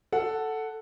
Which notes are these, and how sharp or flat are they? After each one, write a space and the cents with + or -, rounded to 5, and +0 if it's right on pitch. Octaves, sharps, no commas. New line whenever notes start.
A4 +0 F#5 +0